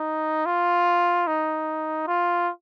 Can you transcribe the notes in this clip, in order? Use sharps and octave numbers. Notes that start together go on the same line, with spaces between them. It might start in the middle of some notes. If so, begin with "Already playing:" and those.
Already playing: D#4
F4
D#4
F4